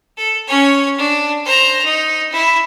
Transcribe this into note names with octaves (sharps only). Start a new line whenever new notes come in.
A4
C#4 C#5
D4
C5 A#5
D#4
E4